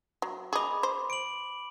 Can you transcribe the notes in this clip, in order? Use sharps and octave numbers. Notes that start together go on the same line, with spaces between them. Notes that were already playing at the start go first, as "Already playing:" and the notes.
F#3
G#4 D#5 B5 D6
C5
D7 F#7